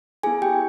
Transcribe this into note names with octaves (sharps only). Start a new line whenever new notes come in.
B3 E4 G#4 A4 G#5
G4 G5